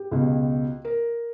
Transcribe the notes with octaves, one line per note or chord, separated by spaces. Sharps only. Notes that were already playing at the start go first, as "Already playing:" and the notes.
Already playing: G4
C#2 B2
A#4